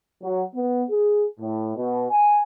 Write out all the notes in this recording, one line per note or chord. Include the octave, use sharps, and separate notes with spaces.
F#3
B3
G#4
A2
B2
G#5